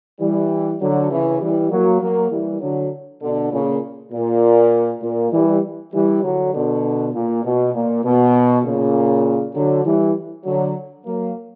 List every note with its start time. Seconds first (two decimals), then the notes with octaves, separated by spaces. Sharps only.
0.20 E3 G3
0.81 D3 F#3
1.11 C#3 E3
1.41 E3 G3
1.71 F#3 A#3
2.01 F#3 A#3
2.31 E3 G3
2.61 D3 F#3
3.22 B2 D3
3.52 A#2 C#3
4.12 A#2
5.02 A#2
5.33 E3 G3
5.93 E3 G3
6.23 D3 F#3
6.54 B2 D3
7.14 A#2
7.44 B2
7.74 A#2
8.04 B2
8.64 A#2 C#3
9.55 D3 F#3
9.85 E3 G3
10.45 D3 F#3
11.06 F#3 A#3